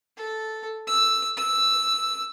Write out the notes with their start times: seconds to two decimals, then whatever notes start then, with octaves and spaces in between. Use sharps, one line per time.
0.17 A4
0.87 E6
1.37 E6